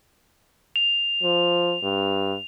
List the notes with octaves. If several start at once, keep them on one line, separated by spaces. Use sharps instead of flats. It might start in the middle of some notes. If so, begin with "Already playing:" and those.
F7
F3
G2